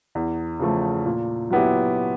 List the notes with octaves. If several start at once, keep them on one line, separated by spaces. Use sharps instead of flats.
E2
C#3 F3 A3
A#2
F#3 B3 E4 G4